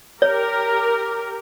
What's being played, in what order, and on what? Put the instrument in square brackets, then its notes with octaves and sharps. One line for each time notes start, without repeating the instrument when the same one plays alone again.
[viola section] G4 A#4 [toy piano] C#5